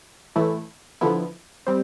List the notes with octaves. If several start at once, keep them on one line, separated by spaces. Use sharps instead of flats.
A2 E3 A3 E4
D3 F3 B3 E4
G3 C4